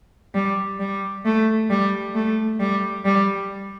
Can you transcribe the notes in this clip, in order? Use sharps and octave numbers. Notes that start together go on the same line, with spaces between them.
G3
G3
A3
G3
A3
G3
G3